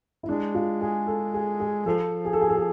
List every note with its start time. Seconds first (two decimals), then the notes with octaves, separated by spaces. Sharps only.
0.23 E4
0.28 G#3 D4
0.55 F4
0.81 G#4
1.07 A4
1.34 G#4
1.60 G#4
1.86 F3 A4
2.25 G#4
2.33 A4
2.41 G#4
2.49 A4
2.56 G#4